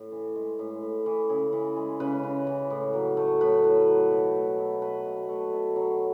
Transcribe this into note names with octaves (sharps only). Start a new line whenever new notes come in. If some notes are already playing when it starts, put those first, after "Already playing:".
Already playing: A2
E3
G#3
A2
A2
E3
C#3 G#4
E3
G#3
C#3 B4
C#3
E3
A2
F#3
A3
A2 B4
A2
F#3
B2
A3
B2
A3 B4
B2
A3
B2
F#3